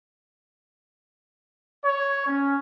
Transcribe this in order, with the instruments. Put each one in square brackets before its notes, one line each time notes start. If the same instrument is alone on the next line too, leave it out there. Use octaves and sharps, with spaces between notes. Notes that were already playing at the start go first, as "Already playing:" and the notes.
[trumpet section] C#5
C#4